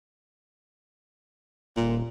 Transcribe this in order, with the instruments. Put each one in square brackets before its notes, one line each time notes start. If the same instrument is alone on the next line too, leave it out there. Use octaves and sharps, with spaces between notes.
[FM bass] D#1 [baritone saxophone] A#2